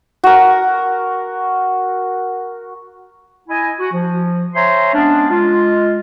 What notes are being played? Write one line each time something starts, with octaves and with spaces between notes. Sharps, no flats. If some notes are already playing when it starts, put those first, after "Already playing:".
F#4 A#4
E4 D#5 G#5
F#4
F3
C5 C#5 E5 G#5 A#5 C6
G#3 B3 C#4 D4
G#3 F4